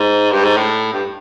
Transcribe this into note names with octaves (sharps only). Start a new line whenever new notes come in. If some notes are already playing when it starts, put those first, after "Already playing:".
Already playing: G#2
G2
G#2
A2
G2